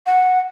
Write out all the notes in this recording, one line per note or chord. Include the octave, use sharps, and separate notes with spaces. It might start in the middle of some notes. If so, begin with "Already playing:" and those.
F#5